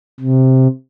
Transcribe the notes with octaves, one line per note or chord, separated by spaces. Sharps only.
C3